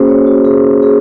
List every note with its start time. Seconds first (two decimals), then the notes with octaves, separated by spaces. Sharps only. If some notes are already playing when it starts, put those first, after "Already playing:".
Already playing: A#3 C#4 F#4 G#4 C5
0.08 C#5
0.27 F#4
0.45 G#4
0.83 G#4